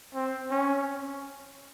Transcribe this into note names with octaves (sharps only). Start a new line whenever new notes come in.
C4
C#4